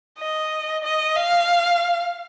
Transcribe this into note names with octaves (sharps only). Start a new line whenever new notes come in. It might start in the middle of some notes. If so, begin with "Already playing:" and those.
D#5
D#5
F5